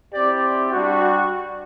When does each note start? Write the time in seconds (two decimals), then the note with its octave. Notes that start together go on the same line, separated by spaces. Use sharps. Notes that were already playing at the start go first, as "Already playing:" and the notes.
0.14 C4 E4 G4 D5
0.72 G3 D4 F#4